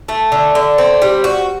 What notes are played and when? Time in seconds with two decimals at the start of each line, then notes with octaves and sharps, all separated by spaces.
0.08 A3
0.32 D3
0.55 D3
0.78 C4
1.02 G3
1.24 F#4